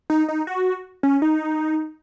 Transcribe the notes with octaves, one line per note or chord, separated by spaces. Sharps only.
D#4
D#4
F#4
C#4
D#4